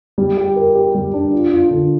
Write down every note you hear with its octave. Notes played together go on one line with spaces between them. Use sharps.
G3
G4
A#4
G4
G3
D4
F4
F4
D3